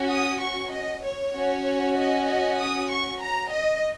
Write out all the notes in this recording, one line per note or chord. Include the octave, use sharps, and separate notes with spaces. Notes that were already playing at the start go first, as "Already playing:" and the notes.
Already playing: C#4 F#4
D#6
C#6
D#5
C#5
C#4 F#4
D#5
D#5
D#6
C#6
A#5
D#5